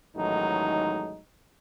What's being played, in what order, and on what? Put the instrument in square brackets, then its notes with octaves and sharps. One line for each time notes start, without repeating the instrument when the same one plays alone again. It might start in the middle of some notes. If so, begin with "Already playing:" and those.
[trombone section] A1 D#3 F#3 G#3 A3 D#4